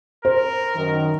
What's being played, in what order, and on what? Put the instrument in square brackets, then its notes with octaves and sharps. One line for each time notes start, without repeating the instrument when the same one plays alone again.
[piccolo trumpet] A#4 [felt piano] C5
[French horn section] F#2 D#3